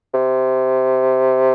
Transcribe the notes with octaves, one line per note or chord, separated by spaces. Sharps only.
C3